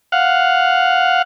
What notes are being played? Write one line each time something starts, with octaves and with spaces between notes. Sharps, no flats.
F5 F#5